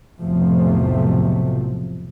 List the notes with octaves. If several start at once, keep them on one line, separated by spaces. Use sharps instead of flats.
F1 B1 A2 C3 F3 A3